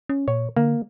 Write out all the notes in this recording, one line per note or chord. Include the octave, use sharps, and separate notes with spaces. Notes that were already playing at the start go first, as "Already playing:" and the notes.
C#4
A#2 C#5
D3 A#3